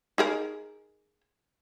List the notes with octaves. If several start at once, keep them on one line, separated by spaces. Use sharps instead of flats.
D#4 G#4 A#4